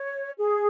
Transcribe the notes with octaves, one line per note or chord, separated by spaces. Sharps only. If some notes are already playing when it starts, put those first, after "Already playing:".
Already playing: C#5
G#4